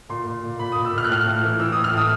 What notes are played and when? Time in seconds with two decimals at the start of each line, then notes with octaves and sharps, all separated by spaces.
0.09 A#2 C6
0.26 A#2
0.43 A#2
0.59 A#2 B5
0.72 A#2 D#6
0.85 E6
0.93 A#2
0.98 F6
1.04 F#6
1.09 A2 F6
1.26 A2
1.43 E3
1.59 E3 E6
1.72 A2 D#6
1.84 F6
1.93 A2 D#6